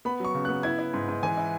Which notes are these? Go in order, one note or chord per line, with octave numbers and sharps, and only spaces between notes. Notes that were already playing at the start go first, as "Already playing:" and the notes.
B3 B5
F#3 C#6
C#3
F#6
B3
E4 G#6
E4
G#2
G#2
E3 G#5
E4